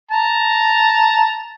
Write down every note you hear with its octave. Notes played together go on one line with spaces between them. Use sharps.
A5 A#5